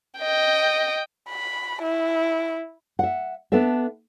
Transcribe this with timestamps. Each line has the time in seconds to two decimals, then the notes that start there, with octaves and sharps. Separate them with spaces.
0.19 D#5 G5
1.30 B5
1.83 E4
2.99 E5 F#5
3.52 B3 D4 A4 E5